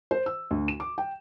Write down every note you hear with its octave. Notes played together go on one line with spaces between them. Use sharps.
C5
E6
D2
E7
D6
G5